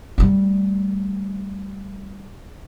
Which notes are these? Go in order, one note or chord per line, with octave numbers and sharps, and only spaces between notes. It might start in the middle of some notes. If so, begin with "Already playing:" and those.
G3 A3